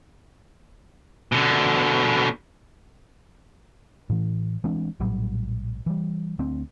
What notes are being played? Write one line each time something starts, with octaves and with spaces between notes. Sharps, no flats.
B2 D3
A2 E3
E3 G#3 C4 D4
A#1 A2 F#3 G3
E3 G3
D2 C4